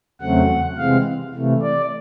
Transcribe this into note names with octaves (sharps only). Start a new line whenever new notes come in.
E2 C#3 F#3 A3 C4 F#5
C3 E3 G#3 C4 F5
C3 E3 A3
D5